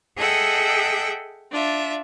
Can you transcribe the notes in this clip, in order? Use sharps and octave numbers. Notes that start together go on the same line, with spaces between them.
G#4 A4 D#5 E5 F#5 G5
D4 F4 E5